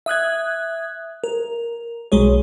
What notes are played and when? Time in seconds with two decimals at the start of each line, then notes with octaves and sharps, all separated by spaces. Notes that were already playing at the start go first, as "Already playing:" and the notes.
0.06 E5 D#6 F#6 G#6
1.24 A#4
2.12 B1 G#3 G#4 C#5